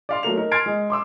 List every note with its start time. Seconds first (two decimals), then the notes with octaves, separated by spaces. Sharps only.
0.09 D5 F5 C6
0.23 F#3 A3 A#4 F7
0.37 D#4 A#4
0.52 C6 F6 G#6 A6 C7 D7
0.66 G#3
0.90 C6 D6 E6